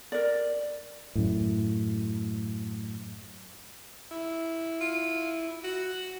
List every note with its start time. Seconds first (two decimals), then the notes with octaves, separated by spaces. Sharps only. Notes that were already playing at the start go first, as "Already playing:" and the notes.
0.12 A#4 D5
1.15 F#2 A2
4.11 E4
4.81 F4
5.64 F#4